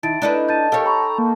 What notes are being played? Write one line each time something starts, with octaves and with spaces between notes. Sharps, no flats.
D#3 E4 A5 A6 D7
D4 D#4 A4 B4
A5 G6 A6 D#7
G4 A4 A#4 C#5 F5 G5
A#5 B5 C#6
A#3